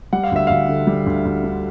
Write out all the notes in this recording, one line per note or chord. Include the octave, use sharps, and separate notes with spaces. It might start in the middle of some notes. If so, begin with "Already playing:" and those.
G3 F#5
F5
D2 E5
D2 F5
D3
G3
D2
D2
D3